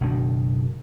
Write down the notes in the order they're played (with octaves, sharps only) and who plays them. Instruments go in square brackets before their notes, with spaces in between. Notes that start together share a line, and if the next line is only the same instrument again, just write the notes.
[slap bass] F#1 B2 D#3 D4